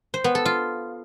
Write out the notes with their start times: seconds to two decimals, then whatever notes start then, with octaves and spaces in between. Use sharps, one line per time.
0.14 C5
0.24 B3
0.35 A4
0.45 F4